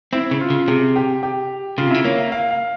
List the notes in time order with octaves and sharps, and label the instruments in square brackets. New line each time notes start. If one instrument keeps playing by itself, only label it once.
[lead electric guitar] C4 [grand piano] E4
[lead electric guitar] C#3
[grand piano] F4
[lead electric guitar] C#3
[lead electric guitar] C3 [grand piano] G#4
[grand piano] G4
G4
[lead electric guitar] C#3 [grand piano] F4
[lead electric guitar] C3
[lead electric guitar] C#3 [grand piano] E4
[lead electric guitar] A#3 [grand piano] C#5
[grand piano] E5
F5
F5